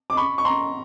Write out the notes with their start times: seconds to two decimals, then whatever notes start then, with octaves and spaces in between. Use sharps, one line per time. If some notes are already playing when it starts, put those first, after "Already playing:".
0.10 D6
0.17 B5 C#6
0.38 C#6
0.45 A#5 C6